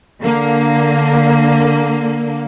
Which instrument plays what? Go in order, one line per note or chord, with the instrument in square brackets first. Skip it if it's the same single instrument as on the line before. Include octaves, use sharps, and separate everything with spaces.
[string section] D3 A#3